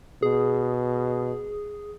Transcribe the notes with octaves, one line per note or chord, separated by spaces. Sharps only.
B2 G#4